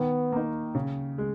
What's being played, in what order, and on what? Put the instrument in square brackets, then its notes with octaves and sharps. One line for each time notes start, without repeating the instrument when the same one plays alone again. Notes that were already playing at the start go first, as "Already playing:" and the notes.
Already playing: [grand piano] D#3 [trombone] B3
[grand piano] A#3 D#4
C#3
G#3